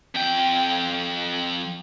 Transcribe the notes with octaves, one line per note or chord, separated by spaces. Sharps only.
F2 G5